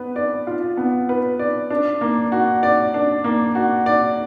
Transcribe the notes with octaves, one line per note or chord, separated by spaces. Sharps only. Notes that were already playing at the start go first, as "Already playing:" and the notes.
Already playing: B3 B4
D5
F4
B3
B4
D5
D4
A#3
F#4
D5
D4
A#3
F#4
D5